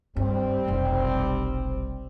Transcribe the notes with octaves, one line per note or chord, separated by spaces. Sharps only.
G2 G3 C4
F1 B1